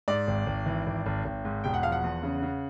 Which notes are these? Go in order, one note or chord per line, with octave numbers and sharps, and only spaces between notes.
G#2 D5
G#1
G#1
E3
G#1
G#1
G#1
G#2
E1 G5
F#5
F3 F5
F#5
E2
C#3
C#3